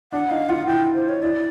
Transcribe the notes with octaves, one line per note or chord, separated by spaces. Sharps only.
D4 F#5
D#4 F5
F4 F#5
E4 G5
C5
C#5
E4 D5